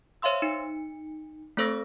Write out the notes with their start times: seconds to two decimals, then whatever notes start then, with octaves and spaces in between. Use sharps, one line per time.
0.22 C5 C#5 E5 F5 C6 E6
0.42 D#4 C#7
1.57 A3 C4 A4 C5 E6 A#6